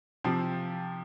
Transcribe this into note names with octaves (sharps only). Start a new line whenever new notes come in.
C3 F3 C4 G4